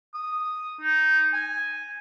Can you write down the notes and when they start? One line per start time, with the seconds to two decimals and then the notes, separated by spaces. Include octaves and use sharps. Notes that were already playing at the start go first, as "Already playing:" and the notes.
0.14 D#6
0.81 D#4
1.33 G#5